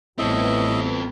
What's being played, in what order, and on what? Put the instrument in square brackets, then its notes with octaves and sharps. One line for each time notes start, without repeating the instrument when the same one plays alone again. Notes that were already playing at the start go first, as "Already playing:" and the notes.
[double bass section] A1 G3 B3 [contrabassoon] A2 [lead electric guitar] C4 A4 [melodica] D#5 E5